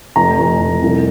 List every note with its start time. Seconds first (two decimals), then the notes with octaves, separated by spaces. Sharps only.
0.16 F1 A#5
0.38 F1
0.59 F1
0.82 C2